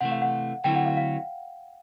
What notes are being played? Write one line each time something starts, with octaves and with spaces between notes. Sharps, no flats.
C3 E3 A3 F#5
F5
F#5
D3 F#3 A3 C4 E4 G5
F#5
F5
F5